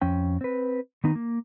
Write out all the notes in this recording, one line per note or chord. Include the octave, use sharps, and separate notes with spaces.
F2 C#4 G5
C4 B4
D#3 B3 D#4
A#3